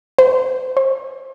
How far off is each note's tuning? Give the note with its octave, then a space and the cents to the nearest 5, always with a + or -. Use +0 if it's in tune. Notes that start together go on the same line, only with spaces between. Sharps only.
C5 -30
C5 +35